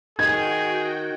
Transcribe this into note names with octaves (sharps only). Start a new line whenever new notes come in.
D#3 F#4 G#4 G5 G#6